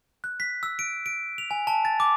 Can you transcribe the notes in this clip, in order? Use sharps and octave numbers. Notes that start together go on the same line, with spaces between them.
F#6
B6
E6
D7
D7
F7
G#5
A5
A6
D6